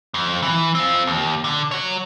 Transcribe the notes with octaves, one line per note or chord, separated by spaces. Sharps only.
F2
E3
C4 F4
D#2
D3
F#4 C#5